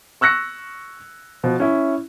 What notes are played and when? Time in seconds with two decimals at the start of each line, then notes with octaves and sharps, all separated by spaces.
0.21 C#6 E6 F#6 A#6 C#7
1.44 B2 F3
1.60 C#4 E4